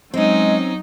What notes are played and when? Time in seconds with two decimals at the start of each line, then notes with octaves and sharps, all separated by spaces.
0.14 F#3 G#3 C4 C#4 D#4